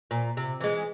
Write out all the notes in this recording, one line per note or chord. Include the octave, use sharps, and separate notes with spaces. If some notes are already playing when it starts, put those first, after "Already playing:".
A#2
C3
E3 G#3